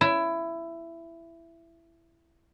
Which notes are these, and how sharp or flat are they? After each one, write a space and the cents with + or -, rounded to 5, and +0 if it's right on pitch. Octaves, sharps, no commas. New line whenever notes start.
E4 +15